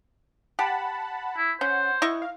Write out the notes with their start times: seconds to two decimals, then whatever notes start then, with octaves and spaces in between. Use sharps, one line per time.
0.59 G4 F#5 A5 B5
1.37 E4
1.61 C#4 C5 F#5
2.02 E4 D#5 C#6
2.22 F5